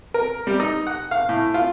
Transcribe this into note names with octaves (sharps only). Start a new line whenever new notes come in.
A#4
G3
D#4
F#5
F5
A2
F4